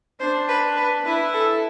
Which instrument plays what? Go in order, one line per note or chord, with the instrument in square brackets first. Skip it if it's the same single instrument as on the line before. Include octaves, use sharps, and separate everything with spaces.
[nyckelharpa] D4 [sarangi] C5
[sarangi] B4
B4
[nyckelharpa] E4 [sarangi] B4
[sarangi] A4